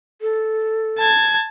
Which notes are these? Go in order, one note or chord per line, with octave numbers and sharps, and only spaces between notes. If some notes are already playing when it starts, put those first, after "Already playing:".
A4
A5 G#6